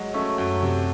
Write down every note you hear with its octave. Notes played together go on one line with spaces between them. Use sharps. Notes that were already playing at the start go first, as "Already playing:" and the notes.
Already playing: F#3 G#3
A3 C#4
F#2
C3